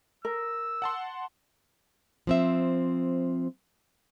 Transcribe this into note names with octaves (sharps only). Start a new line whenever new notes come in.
A#4 E6
F#5 A5 C6
F3 C4 E5